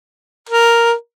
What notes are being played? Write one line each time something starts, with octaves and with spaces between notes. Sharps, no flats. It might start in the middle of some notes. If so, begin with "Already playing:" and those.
A#4